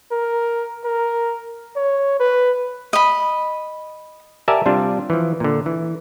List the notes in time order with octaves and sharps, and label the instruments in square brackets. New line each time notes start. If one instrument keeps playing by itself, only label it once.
[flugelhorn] A#4
A#4
C#5
B4
[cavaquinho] D#5 B5
[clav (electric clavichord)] G4 A#4 D5 E5 G#5 A5
C3 G3 D4 F4
E3 F3
A#2 D3
E3